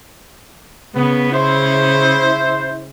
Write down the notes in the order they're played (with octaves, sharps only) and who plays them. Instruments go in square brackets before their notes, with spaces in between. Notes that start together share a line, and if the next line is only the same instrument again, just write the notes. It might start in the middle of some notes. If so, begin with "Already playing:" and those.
[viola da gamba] C#3 [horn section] B3
[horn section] E4 C5